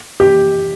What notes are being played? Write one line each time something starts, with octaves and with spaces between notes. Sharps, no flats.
G4